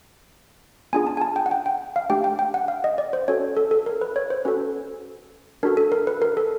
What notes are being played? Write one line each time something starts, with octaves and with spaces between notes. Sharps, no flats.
B3 D4 F4 G#4 G#5
A5
G#5
A5
G5
F#5
G5
G5
F5
A3 D4 G4 G5
G5
G5
F#5
F5
D#5
D5
C5
C#4 F#4 A4 C#5
A4
A4
A#4
B4
C#5
C5
C#4 F#4 A4 B4
D4 F#4 A4 A#4
A4
A#4
B4
A#4
A4